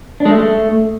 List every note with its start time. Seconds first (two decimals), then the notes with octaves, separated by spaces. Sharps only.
0.20 D4
0.25 G#3
0.31 A3